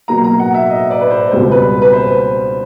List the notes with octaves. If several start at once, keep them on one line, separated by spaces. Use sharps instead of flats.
B2 F#3 A#3 A#5
A#5
F#5
E5
D#5
D5
B4
C5
C#2 B2 G3 C4 C5
B4
B4
C5